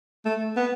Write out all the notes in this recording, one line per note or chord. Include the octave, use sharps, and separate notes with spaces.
A3
B3